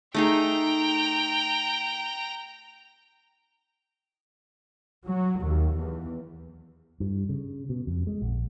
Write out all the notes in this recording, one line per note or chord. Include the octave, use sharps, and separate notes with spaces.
A3 D#4 G#4 G5 A#5
F#3
D#2
E2
G2
C#3
B2
F2
G#3
A#1